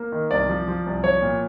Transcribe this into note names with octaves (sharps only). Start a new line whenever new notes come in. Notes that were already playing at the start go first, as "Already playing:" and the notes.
Already playing: A#3
D#3
C2 D5
F3
F3
C2
F3 C#5
A#2